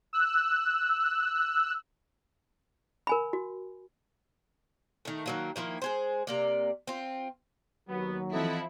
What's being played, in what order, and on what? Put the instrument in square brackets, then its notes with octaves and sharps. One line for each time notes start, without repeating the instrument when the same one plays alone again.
[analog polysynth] E6 F#6
[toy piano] A#4 G#5 B5
F#4
[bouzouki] D#3 A3
D#3 F#3 A#3
D#3 F3 A#3 E4
G#3 G#4 C5
C3 A#3 D5
C4 F4
[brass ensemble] D#2 F#3 [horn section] B3
[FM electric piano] E3 C4 A4 [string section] F3 E4 [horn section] D#5 F#5 A5